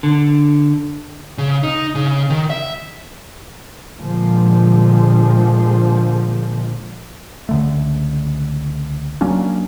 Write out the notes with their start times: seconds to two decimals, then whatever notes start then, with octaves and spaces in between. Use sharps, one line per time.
0.03 D3
1.38 C#3
1.63 D#4
1.95 C#3
2.30 D#3
2.50 E5
3.99 A#2 D3 F3 G#3
7.49 C#2 D3 A3
9.21 F#3 A#3 C#4 D4